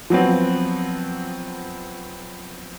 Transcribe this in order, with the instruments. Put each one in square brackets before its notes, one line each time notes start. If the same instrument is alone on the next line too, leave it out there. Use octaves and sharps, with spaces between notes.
[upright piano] F3 F#3 B3 C4